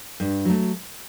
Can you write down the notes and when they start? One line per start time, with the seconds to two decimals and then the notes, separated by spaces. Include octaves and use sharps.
0.20 G2
0.45 F#3 A3